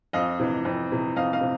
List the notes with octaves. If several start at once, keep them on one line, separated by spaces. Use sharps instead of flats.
F2 D#5 F5
C3 E3
F2
C3 E3
F2 D#5 F5
D#5 F5
C3